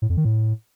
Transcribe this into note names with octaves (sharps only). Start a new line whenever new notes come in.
A2
F2
D#3
A2